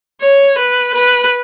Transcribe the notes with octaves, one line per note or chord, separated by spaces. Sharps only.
C#5
B4
B4